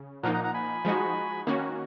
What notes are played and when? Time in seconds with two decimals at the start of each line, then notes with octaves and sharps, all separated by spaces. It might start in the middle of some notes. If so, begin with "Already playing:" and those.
Already playing: C#3
0.23 A#2 F3 A#3 D#4 F#5 A#5
0.33 F#5 A#5
0.44 F#5 A#5
0.54 G#5 B5
0.85 F3 G#3 D#4 F#4
1.47 D#3 A#3 C#4 F#4